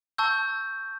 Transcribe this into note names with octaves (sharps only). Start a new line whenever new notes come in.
A5 C#6 E6 G6